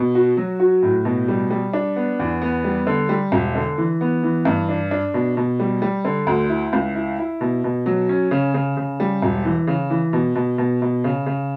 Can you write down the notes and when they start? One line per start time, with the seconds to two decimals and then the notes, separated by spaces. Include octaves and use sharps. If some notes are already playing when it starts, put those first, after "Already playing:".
Already playing: B2
0.15 F#4
0.37 F#3
0.60 F#4
0.83 A2
1.05 B2
1.28 G3
1.50 G3
1.73 D4
1.96 B3
2.19 E2
2.42 B3
2.64 G3
2.87 D3
3.09 G3
3.32 E1
3.55 D3
3.78 E3
4.01 B3
4.23 E3
4.45 G2
4.69 D4
4.91 D4
5.14 B2
5.37 B2
5.60 G3
5.82 G3
6.05 D3
6.27 D2
6.49 E4
6.73 C#2
6.95 E4
7.19 E4
7.41 B2
7.64 B2
7.86 F#3
8.09 C#4
8.31 C#3
8.54 C#3
8.77 C#3
9.00 G3
9.22 E1
9.45 E3
9.67 C#3
9.90 E3
10.13 B2
10.35 B2
10.58 B2
10.82 B2
11.04 C#3
11.26 C#3